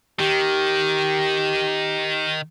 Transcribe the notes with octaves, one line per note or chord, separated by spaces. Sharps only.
D#3 G4